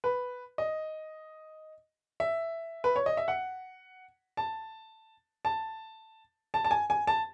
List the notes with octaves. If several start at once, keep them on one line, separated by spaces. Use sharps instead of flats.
B4
D#5
E5
B4
C#5
D#5
E5
F#5
A5
A5
A5
A5
G#5
G#5
A5